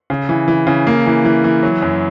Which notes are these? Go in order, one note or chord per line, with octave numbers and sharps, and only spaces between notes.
C#3
E3
E3
C#3
A#3
E3
E3
E3
F#3
F#2